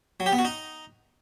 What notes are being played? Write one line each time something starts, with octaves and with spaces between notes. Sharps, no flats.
F#3
G4
B3
F#4
D#4